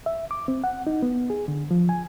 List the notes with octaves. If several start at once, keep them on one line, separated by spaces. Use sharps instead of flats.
E5
D6
C4
F#5
D#4
B3
G#4
D3
F3
G#5